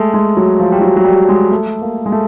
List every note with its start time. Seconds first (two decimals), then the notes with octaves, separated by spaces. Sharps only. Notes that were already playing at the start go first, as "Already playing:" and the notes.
Already playing: G#3 A3
0.14 G#3
0.37 F#3
0.59 F3
0.72 G3
0.82 F#3
0.96 F#3
1.04 G3
1.29 G#3
1.52 A3
1.82 A#3
2.06 G#3
2.12 A3